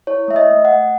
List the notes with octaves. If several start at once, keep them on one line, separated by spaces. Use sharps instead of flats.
E4 C#5
A3 E5
D#5
A3
F#5
A3